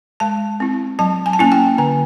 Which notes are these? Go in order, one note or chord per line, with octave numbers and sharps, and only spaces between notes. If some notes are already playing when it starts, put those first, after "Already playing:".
G#3 A5
C4 E4
F#3 A5
G#5
A5
A#3 C#4 E4 G#5
G5
D3 G#5